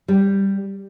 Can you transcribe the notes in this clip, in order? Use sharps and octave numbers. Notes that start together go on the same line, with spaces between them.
G3